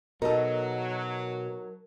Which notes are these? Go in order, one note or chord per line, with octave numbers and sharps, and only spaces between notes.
B2 F#3 D#4 A4 A#4